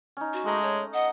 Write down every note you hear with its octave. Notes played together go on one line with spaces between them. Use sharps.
C#4 D#4
F#4
G#3 A3 A#5 D#6
C#5
D#5 F#5